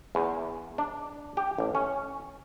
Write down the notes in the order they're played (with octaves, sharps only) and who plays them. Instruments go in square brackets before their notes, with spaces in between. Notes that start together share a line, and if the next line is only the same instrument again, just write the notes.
[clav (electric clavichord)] E2
D4
G4
A1
C#4